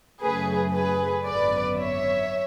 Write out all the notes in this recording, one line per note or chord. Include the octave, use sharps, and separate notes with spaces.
F#2 C#3 F#3 A3 G#4 B4
G#4 B4
G#1 F#2 D3 F#3 B3 B4 D5
C#5 E5